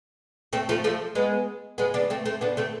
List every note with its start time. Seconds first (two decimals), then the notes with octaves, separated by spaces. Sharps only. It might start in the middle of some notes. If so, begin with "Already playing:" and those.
0.53 A3 C4
0.69 F3 A3
0.84 F3 A3
1.15 G#3 B3
1.78 G#3 B3
1.94 B3 D4
2.10 A3 C4
2.26 A3 C4
2.41 B3 D4
2.57 A3 C4